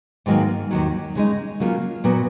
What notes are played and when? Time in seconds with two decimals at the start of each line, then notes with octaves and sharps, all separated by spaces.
0.26 G#2 D#3 F#3 A#3
0.71 D#2 D#3 F#3
1.15 C#3 G#3 D#4
1.60 C#3 F#3 A#3 F4
2.04 A#2 F#3 B3